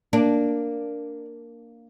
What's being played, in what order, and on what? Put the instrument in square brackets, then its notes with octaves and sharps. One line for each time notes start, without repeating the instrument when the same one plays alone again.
[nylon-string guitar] A#3 [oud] D4